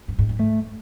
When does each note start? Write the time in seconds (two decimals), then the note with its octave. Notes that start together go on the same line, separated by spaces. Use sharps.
0.08 G2
0.19 G#2
0.29 G#2
0.39 A3